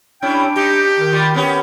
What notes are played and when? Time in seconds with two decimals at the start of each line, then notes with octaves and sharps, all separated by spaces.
0.22 G3 C#4 D4 E4 G5
0.56 D#4 G4
0.99 D#3
1.12 G3 F4
1.34 B3 C#4 G4